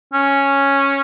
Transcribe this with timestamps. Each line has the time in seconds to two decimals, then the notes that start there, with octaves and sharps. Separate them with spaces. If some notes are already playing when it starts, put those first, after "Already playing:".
0.14 C#4